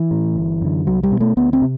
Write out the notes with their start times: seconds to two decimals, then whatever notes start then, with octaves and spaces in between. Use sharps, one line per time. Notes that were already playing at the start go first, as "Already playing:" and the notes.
Already playing: E3
0.11 A2
0.36 G1
0.61 F#2 D3
0.86 C2 F#3
1.03 G3
1.12 B2
1.21 A3
1.37 D2 B3
1.53 C4
1.62 C3